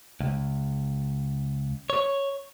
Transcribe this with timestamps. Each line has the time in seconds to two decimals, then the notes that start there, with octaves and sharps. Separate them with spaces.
0.21 C#2
1.90 C#5